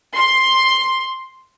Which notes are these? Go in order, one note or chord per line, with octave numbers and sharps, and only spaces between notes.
C6